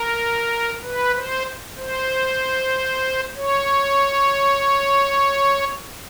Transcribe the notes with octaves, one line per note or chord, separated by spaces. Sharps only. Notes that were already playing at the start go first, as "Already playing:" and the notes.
Already playing: A#4
B4
C5
C5
C#5